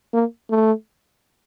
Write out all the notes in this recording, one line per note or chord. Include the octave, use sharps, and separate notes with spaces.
A#3
A3